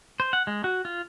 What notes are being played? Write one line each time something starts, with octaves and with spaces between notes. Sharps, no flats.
C5
F#5
G#3
F#4
F4